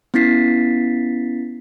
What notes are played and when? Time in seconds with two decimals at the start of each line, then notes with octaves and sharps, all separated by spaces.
0.14 B3 C#4 E4 A6 B6 C7